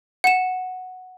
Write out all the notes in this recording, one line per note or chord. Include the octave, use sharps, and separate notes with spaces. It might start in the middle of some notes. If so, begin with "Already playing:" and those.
F#5 E7